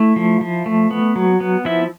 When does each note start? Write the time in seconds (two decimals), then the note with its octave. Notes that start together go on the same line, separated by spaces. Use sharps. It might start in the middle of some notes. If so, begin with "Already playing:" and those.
Already playing: A3 E4 E5
0.16 F3
0.41 F3
0.66 A3
0.91 B3
1.16 F#3
1.40 B3
1.65 F3 E4 E5